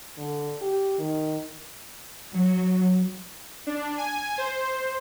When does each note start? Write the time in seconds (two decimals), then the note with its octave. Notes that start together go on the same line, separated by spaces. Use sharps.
0.17 D3
0.61 G4
0.99 D#3
2.34 F#3
3.67 D4
3.98 G#5
4.38 C5